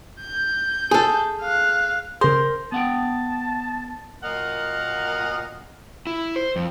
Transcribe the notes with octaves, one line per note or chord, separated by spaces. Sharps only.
G6
G#4 A4
F5 F#6
C#3 G#4 A#4 C5
B3 F#5 G5 A5
A#2 F#3 A#4 D#5 F5 F#5
E4
C5
F2